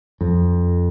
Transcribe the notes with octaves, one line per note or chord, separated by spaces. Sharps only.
F2